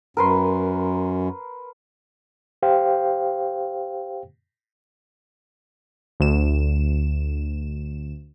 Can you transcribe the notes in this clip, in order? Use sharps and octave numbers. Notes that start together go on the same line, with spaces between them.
F#2 A#4 B4 C6
G4 C5 F5 G5
D2 E7